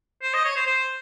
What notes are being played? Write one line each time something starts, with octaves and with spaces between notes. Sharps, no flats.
C5
D#5
C#5
C5
C5